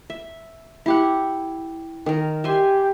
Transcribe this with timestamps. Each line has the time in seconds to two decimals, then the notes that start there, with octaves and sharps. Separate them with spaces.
0.10 E5
0.86 E4 G4 F#5
2.06 D#3 A#4
2.44 G4 E5 G#5 C6